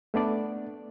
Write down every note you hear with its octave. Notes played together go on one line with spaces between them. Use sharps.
A3 B3 D4 D5